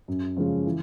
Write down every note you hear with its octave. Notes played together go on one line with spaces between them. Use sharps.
F#2
C#3 F3 G#3 C#4
E3